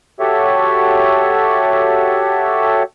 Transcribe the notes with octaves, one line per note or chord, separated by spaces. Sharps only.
F#4 G4 A4 C#5 E5